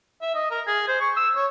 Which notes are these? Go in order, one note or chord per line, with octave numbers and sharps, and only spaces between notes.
E5
D#5
A#4
G#4
C5
C#6
E6
C#5